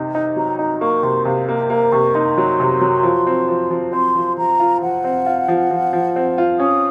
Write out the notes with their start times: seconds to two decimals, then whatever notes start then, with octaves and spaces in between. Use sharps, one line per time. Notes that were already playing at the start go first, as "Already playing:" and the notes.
Already playing: C3 D#4
0.15 D#4
0.36 F#3 A#5
0.59 D#4 A#5
0.81 A#3 C#6
1.03 C3 C6
1.25 C3 F5
1.49 A#3
1.70 A#3 A#5
1.92 C3 C#6
2.14 D#4 C6
2.38 F#3
2.60 C3
2.81 F#3
3.03 F3
3.27 C4
3.49 F3
3.71 F3
3.93 C4 C6
4.15 F3
4.37 F3 A#5
4.60 F4
4.81 F3 F#5
5.04 C4
5.26 F4
5.48 F3
5.71 F3
5.93 F3
6.16 C4
6.38 F4
6.59 C#4 D#6